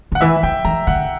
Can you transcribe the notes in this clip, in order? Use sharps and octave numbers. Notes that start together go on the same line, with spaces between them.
D3 F#5
E3 E5
E3 G5
E3 A#5
D3 F#5